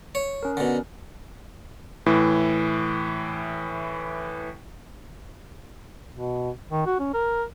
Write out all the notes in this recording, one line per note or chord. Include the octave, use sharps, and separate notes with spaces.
C#5
C#4 A#4
B2 D3
A2 E3
B2
D#3
F#4
C#4
A#4